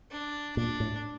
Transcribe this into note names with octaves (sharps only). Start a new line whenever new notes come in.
D4
A#2 D4
A2